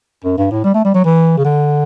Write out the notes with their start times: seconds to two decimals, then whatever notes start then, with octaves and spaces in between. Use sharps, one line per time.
0.24 F#2
0.37 G2
0.51 A2
0.64 G3
0.74 A3
0.85 G3
0.94 F#3
1.05 E3
1.38 C#3
1.45 D3